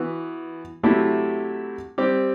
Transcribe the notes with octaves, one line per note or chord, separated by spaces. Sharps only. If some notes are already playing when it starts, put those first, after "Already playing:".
Already playing: E3 B3 F#4
C3 F#3 A3 E4 G4
G3 C4 G4